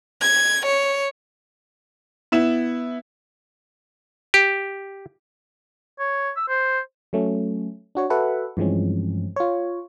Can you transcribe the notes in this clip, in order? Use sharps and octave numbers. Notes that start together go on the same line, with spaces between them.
G#6
C#5
B3 E4 E7
G4
C#5
E6
C5
F#3 A3 C#4
D4 F#4 C#5
F#4 A4 B4 E5 F#5
G2 E3 F3 G#3 C4 C#4
F4 C#5